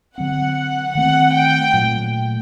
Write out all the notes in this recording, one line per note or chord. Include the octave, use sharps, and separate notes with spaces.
D3 F#3 C4 F#5
D#3 A3 C4 F#5
G5
A#2 F#3 A3